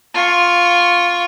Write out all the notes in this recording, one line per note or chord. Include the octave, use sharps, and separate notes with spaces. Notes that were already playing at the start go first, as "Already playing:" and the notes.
F4 C#6